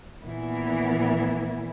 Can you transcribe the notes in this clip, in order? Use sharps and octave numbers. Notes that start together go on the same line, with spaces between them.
A#2 E3 B3 E4